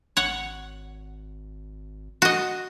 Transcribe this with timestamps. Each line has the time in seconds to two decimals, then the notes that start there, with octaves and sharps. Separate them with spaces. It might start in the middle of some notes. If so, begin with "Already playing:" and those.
0.17 G#1 C#5 F#5
2.22 F#4 D#5